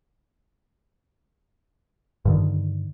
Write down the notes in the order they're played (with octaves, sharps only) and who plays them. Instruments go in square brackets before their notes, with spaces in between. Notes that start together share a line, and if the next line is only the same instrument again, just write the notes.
[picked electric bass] G2 D3 D#3